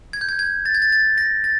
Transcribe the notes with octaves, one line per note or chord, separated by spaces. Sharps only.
G#6
G6
G#6
G#6
A6
G#6
A6
A6
A#6
A6